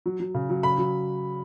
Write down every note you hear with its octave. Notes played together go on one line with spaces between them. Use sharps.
F#3
F#3
C#3
F#3
C#3 B5
F#3